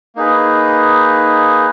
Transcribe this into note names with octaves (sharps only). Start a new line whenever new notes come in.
A#3 D#4 G#4 B4